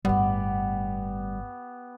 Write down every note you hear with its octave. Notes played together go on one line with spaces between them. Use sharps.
G1 A2 G3 B3 G4 F#5